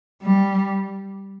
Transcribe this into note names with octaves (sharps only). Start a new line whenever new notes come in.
G3